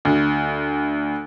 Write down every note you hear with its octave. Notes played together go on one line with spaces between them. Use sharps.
D2